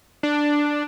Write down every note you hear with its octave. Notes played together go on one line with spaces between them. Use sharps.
D4